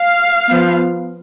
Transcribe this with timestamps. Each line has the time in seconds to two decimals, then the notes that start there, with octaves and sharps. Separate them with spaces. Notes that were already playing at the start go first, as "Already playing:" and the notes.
Already playing: F5
0.49 F3 B3